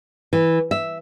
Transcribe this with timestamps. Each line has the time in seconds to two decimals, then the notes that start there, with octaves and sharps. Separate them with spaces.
0.33 E3
0.71 E5